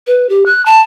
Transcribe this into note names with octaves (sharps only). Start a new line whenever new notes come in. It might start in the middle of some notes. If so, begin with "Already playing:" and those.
B4
G4
F#6
A5